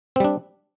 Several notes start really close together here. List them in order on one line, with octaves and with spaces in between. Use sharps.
C4 G3 D4